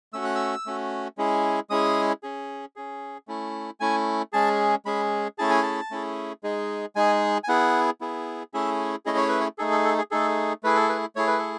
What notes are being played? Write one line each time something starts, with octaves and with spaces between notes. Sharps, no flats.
A3 C#4 F#4 E6
F#6
E6
A3 C#4 F#4
G#3 C#4 E4 G#4
G#3 C#4 E4 G#4 D#6
C#4 G#4
C#4 G#4
A3 C#4 E4
A3 C#4 E4 G#5
G#3 C#4 G#4 A5
G#3 C#4 G#4 B5
A3 C#4 E4 G#4 A5
G#5
A5
A3 C#4 E4 G#4
G#3 D#4 G#4
G#3 D#4 G#4 G#5
G#5
B3 E4 G#4 F#5
B3 E4 G#4
A3 C#4 E4 G#4 E5
A3 C#4 E4 G#4 D#5
C#5
B4
C#5
A3 D#4 G#4 A4
A4
A4
G#4
A3 D#4 G#4 A4
A3 E4 G#4 B4
A4
B4
A3 E4 G#4 C#5
B4
A4